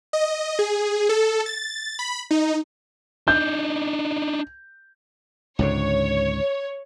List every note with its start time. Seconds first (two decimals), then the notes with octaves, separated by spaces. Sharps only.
0.13 D#5
0.59 G#4
1.09 A4
1.46 A6
1.99 B5
2.31 D#4
3.28 D4 D#4 G6
5.59 C#2 G#2 D3 C#5